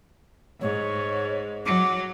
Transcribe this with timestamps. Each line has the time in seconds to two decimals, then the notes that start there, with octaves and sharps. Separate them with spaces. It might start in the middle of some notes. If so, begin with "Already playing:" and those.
0.61 G#2 C#5
1.66 F#3 D6